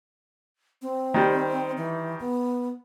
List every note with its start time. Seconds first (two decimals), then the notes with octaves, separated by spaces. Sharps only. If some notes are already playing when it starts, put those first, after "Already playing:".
0.82 C4
1.14 D#3 G3
1.77 E3
2.20 B3